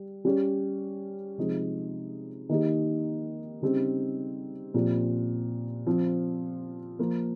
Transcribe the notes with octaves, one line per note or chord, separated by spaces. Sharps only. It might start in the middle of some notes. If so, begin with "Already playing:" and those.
Already playing: G3
G3 C#4 G4
C3 F3 G#3 D#4
D#3 A#3 D#4 G4
C#3 G3 C4 D#4 G4
A#2 F3 C4 G4
F3 C4 F4
F3 A#3 F4